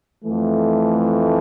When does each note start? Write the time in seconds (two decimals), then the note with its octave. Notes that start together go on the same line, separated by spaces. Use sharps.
0.25 F2 E3 A3